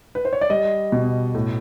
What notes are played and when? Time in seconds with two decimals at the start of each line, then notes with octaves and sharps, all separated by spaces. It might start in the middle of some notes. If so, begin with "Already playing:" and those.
0.15 B4
0.25 C5
0.33 C#5
0.41 D5
0.50 G3 D#5
0.92 B2
1.35 A2